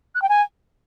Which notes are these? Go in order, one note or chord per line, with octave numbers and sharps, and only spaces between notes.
F#6
G5
G#5